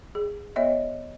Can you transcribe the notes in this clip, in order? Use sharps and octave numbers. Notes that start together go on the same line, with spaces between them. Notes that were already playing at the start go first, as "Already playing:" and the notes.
G#4
B3 C#5 D#5 E5